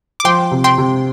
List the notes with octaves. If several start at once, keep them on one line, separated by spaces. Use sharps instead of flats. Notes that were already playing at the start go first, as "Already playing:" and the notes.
D6
F3 G5 C6
C3
G5 C6
C3